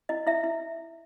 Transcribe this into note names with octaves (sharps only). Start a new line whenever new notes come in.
E4 D#5
E4 E5
E4